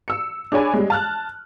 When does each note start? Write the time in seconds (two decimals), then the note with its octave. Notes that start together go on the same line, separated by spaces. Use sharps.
0.08 E6 C#7
0.52 D4 G#4 C#5 G#5 B5
0.74 G3 G#3
0.90 A5 F6 F#6